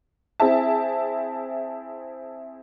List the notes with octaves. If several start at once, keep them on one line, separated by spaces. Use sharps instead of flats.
C4 E4 G#4 E5 A5